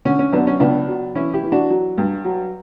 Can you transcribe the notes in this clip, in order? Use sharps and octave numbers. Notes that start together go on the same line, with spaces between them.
D3 C#4
C#4
F#2 B3 D4
C#4
C#2 B3 D4
F#3
E3 C#4 E4
E4 G4
E3
D4 F#4
F#3
G2
F#3